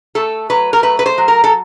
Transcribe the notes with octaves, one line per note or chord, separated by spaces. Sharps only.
A3 A4
F#3 B4
A#4
A3 B4
B4
C5
F#3
A#4
A4